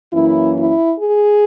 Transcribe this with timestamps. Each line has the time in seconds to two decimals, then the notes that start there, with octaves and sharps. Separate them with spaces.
0.13 F#2 E3 A#3 C#4 E4
0.56 E4
0.98 G#4